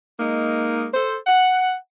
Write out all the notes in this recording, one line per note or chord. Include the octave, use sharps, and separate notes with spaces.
G#3 A#3 D#4
A4 C5
F#5